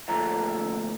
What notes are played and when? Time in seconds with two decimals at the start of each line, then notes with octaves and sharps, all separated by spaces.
0.08 D2 A#2 F3 A3 A#5